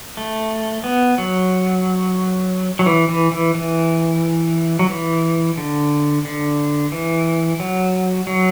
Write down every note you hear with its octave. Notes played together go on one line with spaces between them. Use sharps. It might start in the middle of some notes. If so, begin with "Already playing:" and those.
A3
B3
F#3
F#3
E3
E3
E3
E3
F#3
E3
D3
D3
E3
F#3
F#3